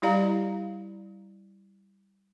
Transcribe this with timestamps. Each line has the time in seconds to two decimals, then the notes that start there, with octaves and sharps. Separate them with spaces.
0.02 G3 E4 G4 D5 F5 A#5